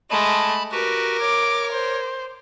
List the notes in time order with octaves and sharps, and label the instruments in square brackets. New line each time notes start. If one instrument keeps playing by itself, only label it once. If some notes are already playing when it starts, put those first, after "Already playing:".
[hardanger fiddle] G#3 A3 [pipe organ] A5 B5
[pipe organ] F#4 G4 B4 [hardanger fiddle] A#4
[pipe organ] C#5 [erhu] D6
[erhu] C5